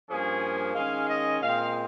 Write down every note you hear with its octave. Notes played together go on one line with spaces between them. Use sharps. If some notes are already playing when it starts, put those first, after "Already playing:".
G2 F3 A#3 C#4 G#4
D#3 G#3 C#4 F5
D#5
A#2 G#3 C4 F5